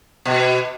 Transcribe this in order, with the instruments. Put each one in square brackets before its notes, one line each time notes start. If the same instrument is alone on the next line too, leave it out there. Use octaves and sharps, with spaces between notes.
[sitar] B2